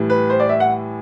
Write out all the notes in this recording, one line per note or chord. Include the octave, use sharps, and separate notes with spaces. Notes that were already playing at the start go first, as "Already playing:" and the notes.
Already playing: A2 E3 G3
B4
C5
D5
E5
F#5